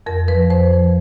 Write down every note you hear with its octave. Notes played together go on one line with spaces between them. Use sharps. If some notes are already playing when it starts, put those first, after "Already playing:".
F2 A#4
F3 B4
F2 C5
F3